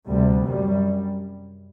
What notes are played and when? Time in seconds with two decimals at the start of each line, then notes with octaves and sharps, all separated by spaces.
0.08 D2 C3 G3
0.46 F#2 G3